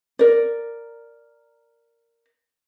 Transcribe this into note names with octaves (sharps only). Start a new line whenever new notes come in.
A#4 D5